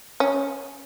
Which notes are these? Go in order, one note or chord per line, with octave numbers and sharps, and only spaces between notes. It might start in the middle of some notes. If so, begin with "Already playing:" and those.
C#4